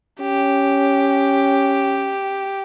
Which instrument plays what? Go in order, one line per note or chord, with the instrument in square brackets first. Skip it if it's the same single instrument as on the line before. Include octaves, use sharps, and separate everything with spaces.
[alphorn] C#4 [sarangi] G4